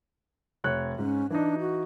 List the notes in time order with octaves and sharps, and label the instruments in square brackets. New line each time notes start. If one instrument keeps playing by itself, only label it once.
[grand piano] F1 C#5 F#6
[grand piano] G#2 [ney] C#4
[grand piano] E3 D#4 [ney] D4
[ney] F#4